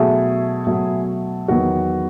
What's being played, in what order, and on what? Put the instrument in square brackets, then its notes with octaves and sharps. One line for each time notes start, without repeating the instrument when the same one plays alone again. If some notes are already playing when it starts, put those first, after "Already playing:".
Already playing: [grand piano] B2 F#3 A3 E4 G#4
B2 F#3 A3
E2 D#3 F#3 B3 F#4